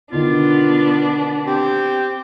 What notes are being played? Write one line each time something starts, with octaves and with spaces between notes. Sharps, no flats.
B2 D3 D#3 B3 D4 F4
C4 G4